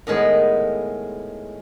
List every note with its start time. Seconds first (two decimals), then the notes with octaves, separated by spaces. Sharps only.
0.07 A2 D#3 G#3 B3